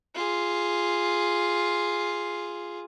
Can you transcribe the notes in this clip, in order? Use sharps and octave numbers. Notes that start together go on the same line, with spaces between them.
F4 G#4